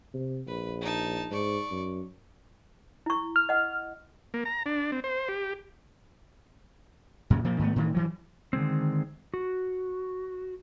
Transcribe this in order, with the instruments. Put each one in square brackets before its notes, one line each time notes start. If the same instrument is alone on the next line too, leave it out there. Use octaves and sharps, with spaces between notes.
[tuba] C3
[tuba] A#1 [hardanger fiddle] B4
[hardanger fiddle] D#4 A5
[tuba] G#2 [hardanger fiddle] D5 C#6
[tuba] F#2
[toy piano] E4 C#6
[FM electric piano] F6
[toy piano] D#5 F#5
[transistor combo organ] A#3
A#5
D4
C4
C5
G4
[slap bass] F#2 A#2 C#3
A#2 F3 A#3
G#2 D#3 A3 B3
A2 D#3 E3
G2 E3 F#3
[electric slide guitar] D3 D#3 G#3 C4
F#4